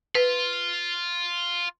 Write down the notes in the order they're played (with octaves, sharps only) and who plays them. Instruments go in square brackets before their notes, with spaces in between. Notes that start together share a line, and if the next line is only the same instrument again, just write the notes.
[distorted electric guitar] F4 [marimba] B4